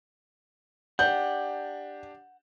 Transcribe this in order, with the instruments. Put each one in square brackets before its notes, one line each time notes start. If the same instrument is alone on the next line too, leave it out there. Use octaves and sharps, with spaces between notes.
[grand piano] D4 G4 [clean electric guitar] F#5 [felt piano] G6